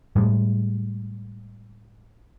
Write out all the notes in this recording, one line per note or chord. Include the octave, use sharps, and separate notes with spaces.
A2 G3 G#3